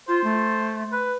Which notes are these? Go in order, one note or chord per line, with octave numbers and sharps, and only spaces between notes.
F4 C5
A3
B4